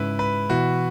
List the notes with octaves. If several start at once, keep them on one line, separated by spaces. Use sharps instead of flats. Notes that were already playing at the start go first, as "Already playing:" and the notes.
Already playing: G#2 C#3 E4 B4
B4
B2 E3 F#4